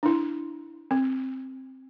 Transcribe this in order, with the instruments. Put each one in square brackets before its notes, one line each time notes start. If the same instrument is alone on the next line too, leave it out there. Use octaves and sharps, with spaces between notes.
[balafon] D4 E4
C4